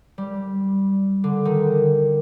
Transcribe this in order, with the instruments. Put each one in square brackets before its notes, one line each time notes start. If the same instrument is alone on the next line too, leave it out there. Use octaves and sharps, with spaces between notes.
[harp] G3
D3
D#3